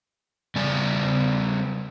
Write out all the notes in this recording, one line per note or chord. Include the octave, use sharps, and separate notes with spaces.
C#3 G3 D5 G#5